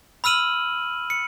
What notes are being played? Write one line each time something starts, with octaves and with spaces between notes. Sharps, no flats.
B5 E6 F6 D#7 F#7
C#7